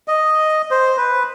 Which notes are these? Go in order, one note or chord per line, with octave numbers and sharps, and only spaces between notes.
D#5
C5
B4